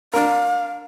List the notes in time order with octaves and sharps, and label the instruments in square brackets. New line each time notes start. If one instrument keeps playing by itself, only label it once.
[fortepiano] D4 A#4 [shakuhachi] F5